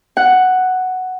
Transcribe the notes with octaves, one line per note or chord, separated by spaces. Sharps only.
F#5